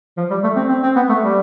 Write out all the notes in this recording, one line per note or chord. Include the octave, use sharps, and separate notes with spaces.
F3
G3
A3
C4
C4
C4
B3
A3
G3